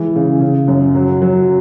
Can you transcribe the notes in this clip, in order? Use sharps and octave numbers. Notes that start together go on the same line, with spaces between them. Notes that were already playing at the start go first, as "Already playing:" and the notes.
Already playing: E3 G#3
C#3
C#3
F#2
F#3
F#3